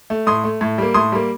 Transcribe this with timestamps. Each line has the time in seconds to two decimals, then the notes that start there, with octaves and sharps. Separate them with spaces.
0.10 A3
0.27 A2 C6 D#6
0.44 A3
0.61 A2
0.78 G3 A#3
0.94 A2 C6 D#6
1.12 G3 A#3